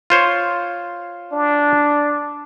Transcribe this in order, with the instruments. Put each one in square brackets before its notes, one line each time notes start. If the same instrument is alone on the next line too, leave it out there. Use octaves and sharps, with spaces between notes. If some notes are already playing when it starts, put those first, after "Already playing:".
[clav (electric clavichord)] F4 C5 C#5
[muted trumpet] D4